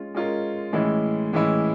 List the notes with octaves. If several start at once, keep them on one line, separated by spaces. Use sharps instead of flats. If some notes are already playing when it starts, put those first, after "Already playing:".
Already playing: G#3 C#4 F4
G#3 C#4 F4 A#4
A2 E3 G#3 C#4 E4
A2 E3 G#3 C#4 E4